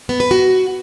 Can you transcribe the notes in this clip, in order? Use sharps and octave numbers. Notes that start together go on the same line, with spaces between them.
B3
B4
F#4